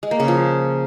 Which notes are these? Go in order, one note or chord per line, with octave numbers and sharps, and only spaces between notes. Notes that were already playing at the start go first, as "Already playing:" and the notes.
G#3
A#3
C#3
F3